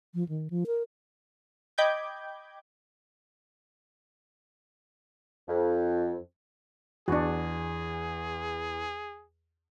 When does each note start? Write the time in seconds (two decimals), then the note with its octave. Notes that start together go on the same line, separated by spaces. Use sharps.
0.14 F3
0.29 D#3
0.50 F3
0.66 A#4
1.78 D#5 G5 B5 D6 G6 G#6
5.48 F2
7.08 E2 D4 F#4 G#4